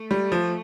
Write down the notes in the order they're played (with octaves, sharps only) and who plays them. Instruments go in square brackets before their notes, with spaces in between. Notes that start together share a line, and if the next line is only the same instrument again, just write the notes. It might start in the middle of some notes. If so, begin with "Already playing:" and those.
Already playing: [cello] A3
[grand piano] G3
F3